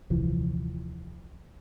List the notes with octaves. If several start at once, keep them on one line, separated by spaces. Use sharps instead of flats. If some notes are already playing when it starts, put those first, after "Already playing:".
D#1 C2 E3 F3